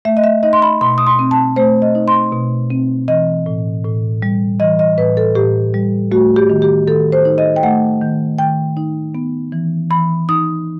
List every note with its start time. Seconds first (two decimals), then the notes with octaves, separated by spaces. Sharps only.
0.05 A3 E5
0.17 D#5
0.24 E5
0.43 D#4 D#5
0.53 C6
0.62 B5
0.81 B2 C6
0.98 D#6
1.07 C6
1.19 C4
1.31 A5
1.56 A3 C5
1.82 D#5
1.95 D#4
2.08 C6
2.33 B2
2.70 C4
3.08 E3 D#5
3.46 A2
3.84 A2
4.22 G3
4.60 E3 D#5
4.79 D#5
4.97 A2 B4
5.17 A4
5.35 A2 G4
5.74 G3
6.12 A3 F#4
6.36 G4
6.50 D#3
6.62 G4
6.87 D#3 A4
7.12 C5
7.25 D#4
7.38 D#5
7.56 G5
7.63 A3 F#5
8.01 D#3
8.38 D#3 G5
8.77 D#4
9.15 B3
9.52 E3
9.90 E3 B5
10.29 D#4 D#6